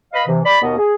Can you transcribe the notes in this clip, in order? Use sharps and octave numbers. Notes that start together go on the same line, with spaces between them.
B4 D#5 F5 B5
C3 E3
D5 B5
D#2 B2 B3 D#5
G#4